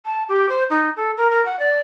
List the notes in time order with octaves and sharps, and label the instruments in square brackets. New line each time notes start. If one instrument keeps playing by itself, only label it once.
[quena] A5
G4
C5
D#4
A4
A#4
A#4
F#5
D5